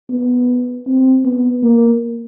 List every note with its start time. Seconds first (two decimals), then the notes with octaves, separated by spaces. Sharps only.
0.10 B3
0.87 C4
1.25 B3
1.63 A#3